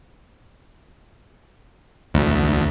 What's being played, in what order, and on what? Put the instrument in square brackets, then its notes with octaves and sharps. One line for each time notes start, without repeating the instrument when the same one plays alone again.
[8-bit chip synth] D2